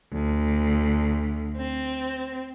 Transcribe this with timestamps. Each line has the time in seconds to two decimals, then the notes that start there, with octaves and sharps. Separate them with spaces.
0.14 D2
1.56 C4